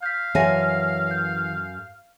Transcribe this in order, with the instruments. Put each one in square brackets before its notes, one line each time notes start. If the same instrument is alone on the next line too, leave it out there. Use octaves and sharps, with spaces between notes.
[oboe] F5 [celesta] G6 B6
[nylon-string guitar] F#2 A4 G#5 [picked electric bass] E3 [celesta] C#5 E5 A#6
[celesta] G6